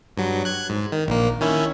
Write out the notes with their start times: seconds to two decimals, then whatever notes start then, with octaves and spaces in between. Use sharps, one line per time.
0.17 G2 F#3
0.45 F#6 G#6
0.70 G#2
0.92 D#3
1.08 A#1 A#3
1.40 D#3 C#4 E4